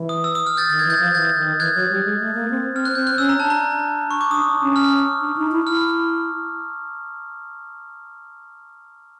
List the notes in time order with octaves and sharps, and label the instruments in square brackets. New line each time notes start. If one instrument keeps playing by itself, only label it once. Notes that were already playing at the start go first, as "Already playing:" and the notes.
Already playing: [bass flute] E3
[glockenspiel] D#6
E6
D#6
F6
G6 A6
[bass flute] D#3 [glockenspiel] A6
[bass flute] E3 [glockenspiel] G#6
[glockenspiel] G6 A6
[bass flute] F3
[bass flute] E3 [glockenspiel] G6 A6
[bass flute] D#3
[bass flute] E3 [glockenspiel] F#6 G#6
[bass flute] F#3
G3
G#3
A3
A#3
C4
[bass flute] C4 [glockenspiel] F6
[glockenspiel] F#6
[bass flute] C4 [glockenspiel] G6
[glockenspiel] F#6
[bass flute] C#4 [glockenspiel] E6
[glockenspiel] A#5
[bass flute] D4 [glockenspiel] A5
[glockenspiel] A#5
C#6
D6
[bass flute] D4 [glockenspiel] D#6
[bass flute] D4
C#4
[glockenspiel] F6
[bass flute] D4
D#4
E4
[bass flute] E4 [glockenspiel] F6